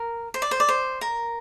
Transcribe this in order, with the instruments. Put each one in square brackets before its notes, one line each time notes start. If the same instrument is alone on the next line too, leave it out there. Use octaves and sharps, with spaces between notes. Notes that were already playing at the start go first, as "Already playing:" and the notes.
Already playing: [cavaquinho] A#4
C5
D5
C5
D5
C5
A#4